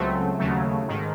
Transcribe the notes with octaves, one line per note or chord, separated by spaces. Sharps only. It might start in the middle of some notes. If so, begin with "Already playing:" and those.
Already playing: C#2 C#3 F#3 A3 C4
D#2 C#3 F#3 A3
G#2 D#3